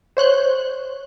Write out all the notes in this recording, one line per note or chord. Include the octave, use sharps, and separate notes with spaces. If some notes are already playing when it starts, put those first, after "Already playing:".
C5 C#5 F#6 G6